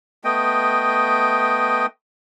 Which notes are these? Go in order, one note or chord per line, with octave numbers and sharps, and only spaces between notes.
A3 B3 D#5 G5